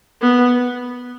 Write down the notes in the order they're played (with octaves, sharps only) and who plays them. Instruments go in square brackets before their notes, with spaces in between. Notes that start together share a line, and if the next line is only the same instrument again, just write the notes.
[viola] B3